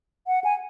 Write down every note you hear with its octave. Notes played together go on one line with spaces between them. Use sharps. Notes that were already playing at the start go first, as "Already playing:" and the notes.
F#5
G#5